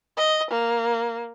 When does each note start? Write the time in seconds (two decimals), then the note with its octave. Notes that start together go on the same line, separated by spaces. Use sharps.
0.17 D#5
0.50 A#3